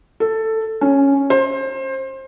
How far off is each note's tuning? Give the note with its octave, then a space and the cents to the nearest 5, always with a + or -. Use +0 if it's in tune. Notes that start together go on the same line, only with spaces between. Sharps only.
A4 +10
C#4 +0
C5 +25